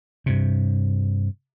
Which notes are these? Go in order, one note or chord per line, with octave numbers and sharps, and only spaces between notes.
G2 C3